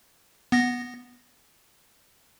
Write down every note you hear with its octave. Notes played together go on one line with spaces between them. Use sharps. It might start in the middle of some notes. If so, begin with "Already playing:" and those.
B3 A#6